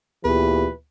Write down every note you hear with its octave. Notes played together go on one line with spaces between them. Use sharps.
D2 A#2 E3 B3 G4 G#4 B4